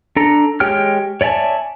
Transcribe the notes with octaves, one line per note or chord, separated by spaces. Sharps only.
D4 A4 A#5
G#3 G4 C#5 G5 F6
C#5 D5 E5 G#5 A5